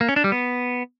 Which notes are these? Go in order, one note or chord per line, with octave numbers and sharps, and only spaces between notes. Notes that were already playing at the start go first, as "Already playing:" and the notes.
A#3
C#4
D4
G3
B3